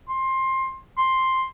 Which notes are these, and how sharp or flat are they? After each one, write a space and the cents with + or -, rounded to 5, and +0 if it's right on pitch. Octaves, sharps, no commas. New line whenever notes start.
C6 +20
C6 +5